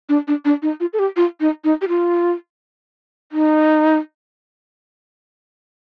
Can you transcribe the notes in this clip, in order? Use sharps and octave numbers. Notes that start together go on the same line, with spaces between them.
D4
D4
D4
D#4
F4
A4
G4
F4
D#4
D#4
G4
F4
D#4